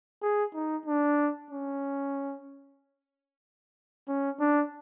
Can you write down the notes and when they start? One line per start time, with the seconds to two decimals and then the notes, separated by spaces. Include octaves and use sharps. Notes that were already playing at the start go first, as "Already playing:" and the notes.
0.22 G#4
0.54 D#4
0.86 D4
1.51 C#4
4.08 C#4
4.40 D4